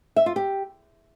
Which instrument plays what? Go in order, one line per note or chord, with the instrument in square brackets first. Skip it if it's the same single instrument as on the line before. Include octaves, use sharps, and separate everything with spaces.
[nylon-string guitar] E5
F4
G4